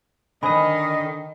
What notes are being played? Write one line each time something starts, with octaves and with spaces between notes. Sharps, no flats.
D3 D#3 C5 D#5 G#5 B5 D#6